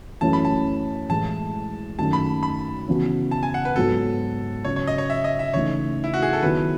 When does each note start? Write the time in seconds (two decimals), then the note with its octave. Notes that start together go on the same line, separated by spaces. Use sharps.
0.21 F#2 E3 A3 C#4 E4 A5
0.33 B5
0.45 A5
1.09 A2 E3 G#3 A5
1.99 F#2 D#3 A3 D#4 F#4 A5
2.13 B5
2.43 B5
2.88 C#3 E3 B3 F#4
3.31 A5
3.43 G#5
3.54 F#5
3.65 B4
3.76 G#2 F#3 B3 F#4 A4
4.65 C#3 F#3 C#4 C#5
4.76 C#5
4.87 D#5
4.98 C#5
5.10 E5
5.24 D#5
5.39 E5
5.54 C#3 E3 A3 D#4 C#5
6.04 E4
6.14 F#4
6.22 G#4
6.33 A4
6.43 D#3 F#3 B3 E4 B4